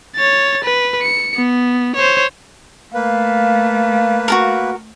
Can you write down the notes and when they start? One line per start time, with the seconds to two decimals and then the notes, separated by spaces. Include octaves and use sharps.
0.16 C#5 A6
0.64 B4
1.03 C#7
1.36 B3
1.96 C5 C#5
2.94 A3 A#3 B4 F5
4.28 F#4 A4 A#4